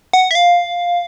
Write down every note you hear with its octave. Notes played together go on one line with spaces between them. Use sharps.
F#5
E5
F5